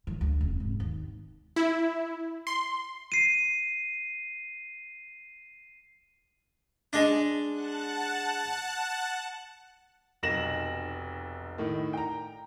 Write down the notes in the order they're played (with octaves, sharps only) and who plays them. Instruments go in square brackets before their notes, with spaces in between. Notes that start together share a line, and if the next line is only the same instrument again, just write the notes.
[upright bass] E3 F#3
D2 A3
D#1 C3
G#1
D#2
[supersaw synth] E4
C6
[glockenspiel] C7 D#7
[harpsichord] G#3 D4
[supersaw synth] F#5 A5 F#6
[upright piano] F1 B1 A#6 E7 F#7
A2 D#3
G5 A#5